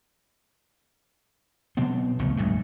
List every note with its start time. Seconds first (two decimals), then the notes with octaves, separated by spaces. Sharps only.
1.77 B2 F#3 B3 C4
2.19 F1 C#2 B2 A3
2.37 A#1 G2 A3